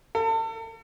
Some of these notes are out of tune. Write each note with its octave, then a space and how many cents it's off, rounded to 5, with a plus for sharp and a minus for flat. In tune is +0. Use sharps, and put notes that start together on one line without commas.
A4 +40